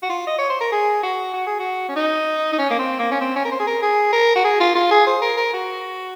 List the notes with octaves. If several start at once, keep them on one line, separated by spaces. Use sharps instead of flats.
F#4
F4
D#5
C#5
C5
A#4
G#4
F#4
F#4
G#4
F#4
C#4
D#4
D#4
C#4
A#3
C4
A#3
C#4
C4
C#4
A#4
C5
G#4
A#4
G#4
A#4
F#4
G#4
F4
F4
G#4
C5
A#4
A#4
F#4